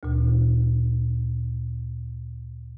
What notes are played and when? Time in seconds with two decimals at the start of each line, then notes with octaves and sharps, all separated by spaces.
0.03 D2 A#2